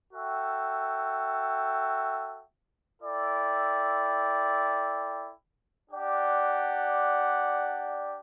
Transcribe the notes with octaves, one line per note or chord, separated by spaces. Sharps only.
F#4 A4 E5 G5
E4 A4 D5 G5
D4 G4 D5 F#5